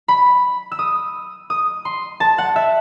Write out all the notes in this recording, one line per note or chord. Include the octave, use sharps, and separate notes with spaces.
B5
E6
D#6
D#6
C6
A5
F#5
E5